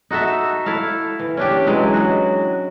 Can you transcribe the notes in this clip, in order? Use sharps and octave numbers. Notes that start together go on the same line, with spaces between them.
D#4 F#4 A4 E5
E4 A4 F5
E3
C#4 D4 G4
E3 F#3 G#3
F#4